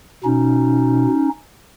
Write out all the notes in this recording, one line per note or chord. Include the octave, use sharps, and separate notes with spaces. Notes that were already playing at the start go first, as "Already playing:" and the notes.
B2 C#4 D#4